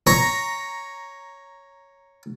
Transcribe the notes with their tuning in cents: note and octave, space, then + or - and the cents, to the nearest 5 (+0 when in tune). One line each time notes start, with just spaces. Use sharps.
C#5 +0 A#5 +0